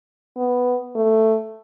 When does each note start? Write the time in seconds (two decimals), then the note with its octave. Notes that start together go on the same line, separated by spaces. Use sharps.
0.37 B3
0.95 A3